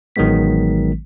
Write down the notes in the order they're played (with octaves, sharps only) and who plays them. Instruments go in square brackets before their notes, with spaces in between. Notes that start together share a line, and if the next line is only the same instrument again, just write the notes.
[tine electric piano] A1 D#3 F#3 G#3 B3 B6